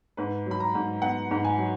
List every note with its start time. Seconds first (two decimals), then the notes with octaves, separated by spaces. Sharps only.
0.17 G#2 B4
0.46 F#3 B5
0.60 A#5
0.75 G#2
1.02 B3 F#5
1.31 G#2
1.45 G#5
1.58 F#3